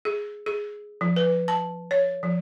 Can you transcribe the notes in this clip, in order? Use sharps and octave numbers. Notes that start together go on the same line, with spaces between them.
G#4
G#4
F3
B4
A5
C#5
F3